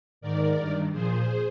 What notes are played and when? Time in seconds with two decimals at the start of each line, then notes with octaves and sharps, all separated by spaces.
0.21 G#2 D#3 A#4 D5
0.56 G2 D#3
0.92 A#2 F3 G#4 C5